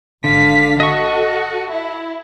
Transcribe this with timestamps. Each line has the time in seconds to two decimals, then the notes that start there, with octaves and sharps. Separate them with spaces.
0.24 G#1 D3 F5 B6
0.80 F#4 A4 D#5 C#6
1.70 E4